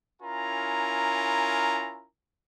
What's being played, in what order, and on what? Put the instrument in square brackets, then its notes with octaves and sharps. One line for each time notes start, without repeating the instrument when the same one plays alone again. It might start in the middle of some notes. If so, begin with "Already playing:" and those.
[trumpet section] C#4 E4 F4 A#4 G#5 A#5